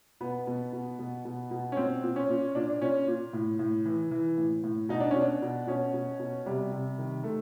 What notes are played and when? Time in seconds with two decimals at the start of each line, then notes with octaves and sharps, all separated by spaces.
0.21 B2 B3
0.47 B2
0.73 B2
0.99 B2
1.25 B2
1.51 B2
1.72 C#4
1.77 A#2 C4
2.03 A#2
2.16 C#4
2.29 A#2
2.55 A#2 D4
2.70 D4
2.81 A#2 C#4
3.07 A#2
3.33 A2
3.59 A2
3.85 E3
4.11 E3
4.38 A2
4.64 A2
4.89 B2 D#4
5.00 D4
5.11 B2 C#4
5.21 D4
5.42 B2
5.67 B2 C#4
5.94 B2
6.20 B2
6.46 C3 G3
6.72 C3
6.98 D#3
7.24 D#3 A3